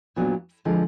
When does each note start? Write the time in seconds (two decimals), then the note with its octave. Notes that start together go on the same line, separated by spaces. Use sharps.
0.16 A#2 F#3 B3 D4
0.65 D3 F3 G#3